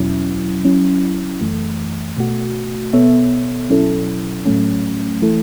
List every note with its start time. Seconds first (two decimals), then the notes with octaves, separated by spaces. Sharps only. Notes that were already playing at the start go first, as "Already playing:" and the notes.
Already playing: E2 B2 F#3 C#4 E4
0.65 F#3 C#4 E4
1.41 F#2 E3 A3
2.17 B2 A3 F#4
2.93 B2 B3 A4 C#5 E5
3.69 B2 F#3 C#4 E4 A4
4.46 A2 F#3 A3 C#4
5.22 E3 A3 E4 A4